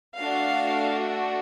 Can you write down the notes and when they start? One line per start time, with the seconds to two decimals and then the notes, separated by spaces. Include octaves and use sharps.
0.17 A3 D4 F#4 F5